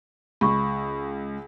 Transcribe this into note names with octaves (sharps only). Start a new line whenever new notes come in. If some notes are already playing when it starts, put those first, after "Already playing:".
C#2 B5 C#6